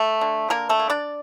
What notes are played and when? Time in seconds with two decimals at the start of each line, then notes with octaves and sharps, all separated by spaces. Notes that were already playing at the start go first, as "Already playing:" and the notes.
Already playing: A3 A4
0.21 D3
0.50 D3 A#3 A#4
0.69 A3 A4
0.79 A#3
0.90 D4 D5